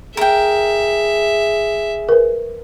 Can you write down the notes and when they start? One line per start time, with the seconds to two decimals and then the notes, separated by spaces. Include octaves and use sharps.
0.17 G#4 A#4 E5 G5
2.09 A#4 B4